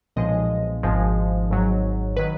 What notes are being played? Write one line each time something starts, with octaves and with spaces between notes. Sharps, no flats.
B1 A#2 F3 G#3 D#5
G#1 G#2 F3 G#3
G#1 G#2 F#3
D#3 F#3 B4